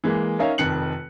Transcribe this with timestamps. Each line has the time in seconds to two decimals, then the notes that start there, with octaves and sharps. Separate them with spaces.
0.04 E3 G#3 A#3
0.39 C#4 D#4 A#4 C#5 E5 F5
0.58 F1 F2 D#3 F#6 C#7 F#7